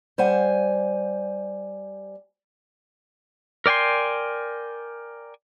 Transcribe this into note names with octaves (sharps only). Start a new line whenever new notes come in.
G3 C5 F#5 G#5
A#4 D5 G5 G#5 C6